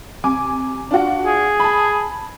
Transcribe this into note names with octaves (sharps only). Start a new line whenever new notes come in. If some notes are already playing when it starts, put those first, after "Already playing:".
C3 G#5 D6
D4 F4 F#4
G#4
A5 B5